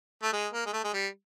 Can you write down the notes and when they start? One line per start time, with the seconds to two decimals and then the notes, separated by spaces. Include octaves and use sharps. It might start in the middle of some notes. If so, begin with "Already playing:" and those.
0.23 A3
0.33 G#3
0.53 A#3
0.66 G#3
0.73 A3
0.84 G#3
0.94 G3